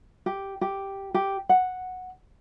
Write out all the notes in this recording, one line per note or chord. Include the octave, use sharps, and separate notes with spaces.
G4
G4
G4
F#5